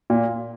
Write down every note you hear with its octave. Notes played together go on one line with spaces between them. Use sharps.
A#2